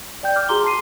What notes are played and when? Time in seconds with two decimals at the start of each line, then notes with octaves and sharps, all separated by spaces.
0.23 D5 G5 G6
0.36 D6 F6
0.49 F#4 G#4 A#5 C6 D6 G7
0.64 A5 C6 C7 D#7